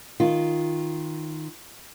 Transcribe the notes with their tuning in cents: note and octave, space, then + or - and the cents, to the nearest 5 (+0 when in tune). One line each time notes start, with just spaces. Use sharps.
D#3 +0 F4 -10